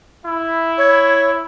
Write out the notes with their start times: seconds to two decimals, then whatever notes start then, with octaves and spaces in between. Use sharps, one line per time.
0.25 E4
0.78 C#5